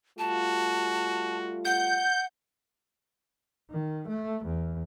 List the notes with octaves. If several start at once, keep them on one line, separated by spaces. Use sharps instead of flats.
G3 A3 F4 F#4 A5
F#5 G6
D#3
A3
E2